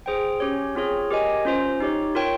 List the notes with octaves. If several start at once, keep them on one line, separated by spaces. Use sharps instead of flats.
G#4 C5 G5
C#4 G4 C#5
C4 F4 G#4 C#5
G4 A#4 D#5 G#5
C#4 F4 C5
D#4 G4 C#5
F4 A#4 C#5 G5